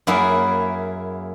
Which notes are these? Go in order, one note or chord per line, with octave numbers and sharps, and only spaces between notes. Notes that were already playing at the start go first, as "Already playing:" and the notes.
F#2 A#3 E4 G#4